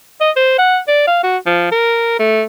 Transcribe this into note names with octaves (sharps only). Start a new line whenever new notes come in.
D#5
C5
F#5
D5
F5
F#4
F3
A#4
A3